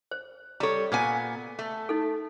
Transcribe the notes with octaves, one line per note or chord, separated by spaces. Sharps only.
C5
G3 A4 C#5 A#5
A#2 B3 G#5
A3
D#4 A4